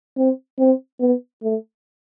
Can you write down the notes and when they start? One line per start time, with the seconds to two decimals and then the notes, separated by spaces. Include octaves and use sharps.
0.17 C4
0.59 C4
1.00 B3
1.43 A3